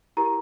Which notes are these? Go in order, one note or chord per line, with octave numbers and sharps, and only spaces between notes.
E4 G4 A#4 A#5